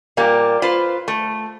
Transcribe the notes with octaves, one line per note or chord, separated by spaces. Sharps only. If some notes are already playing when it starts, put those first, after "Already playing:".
A#2 G3 A#3
F4 B4 C5
A3